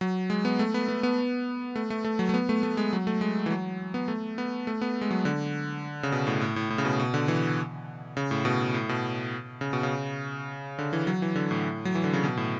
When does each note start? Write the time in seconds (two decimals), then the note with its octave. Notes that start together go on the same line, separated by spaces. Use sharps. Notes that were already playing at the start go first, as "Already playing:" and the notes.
0.01 F#3
0.30 G#3
0.45 B3
0.59 A3
0.74 B3
0.88 B3
1.03 B3
1.76 A3
1.90 A3
2.04 A3
2.19 F#3
2.29 A3
2.34 B3
2.49 A3
2.63 A3
2.77 G#3
2.93 F#3
3.07 A3
3.21 G#3
3.46 E3
3.50 F#3
3.94 B3
4.08 A3
4.38 B3
4.67 A3
4.81 B3
5.01 G#3
5.11 F#3
5.25 D3
6.03 C#3
6.12 B2
6.27 A2
6.41 A2
6.56 A2
6.70 A2
6.78 C#3
6.85 B2
7.00 B2
7.14 D3
7.28 E3
8.17 C#3
8.31 A2
8.45 B2
8.74 A2
8.89 B2
9.61 C#3
9.73 B2
9.83 C#3
10.79 D3
10.93 E3
11.07 F#3
11.22 E3
11.36 D3
11.51 A2
11.85 F#3
11.95 E3
12.04 D3
12.13 C#3
12.24 B2
12.37 A2